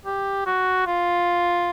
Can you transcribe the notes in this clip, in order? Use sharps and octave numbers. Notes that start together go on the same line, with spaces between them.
G4
F#4
F4